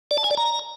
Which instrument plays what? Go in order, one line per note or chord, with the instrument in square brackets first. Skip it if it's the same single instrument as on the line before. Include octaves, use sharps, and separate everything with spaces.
[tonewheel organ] D5
A5
G#5
D5
A#5